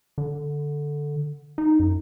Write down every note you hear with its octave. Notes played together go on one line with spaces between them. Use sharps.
D3
D#4
F#2